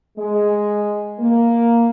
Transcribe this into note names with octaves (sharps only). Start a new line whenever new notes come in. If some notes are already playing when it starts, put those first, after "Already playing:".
G#3
A#3